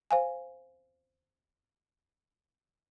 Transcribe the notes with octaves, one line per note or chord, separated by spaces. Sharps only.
C5 F5 G#5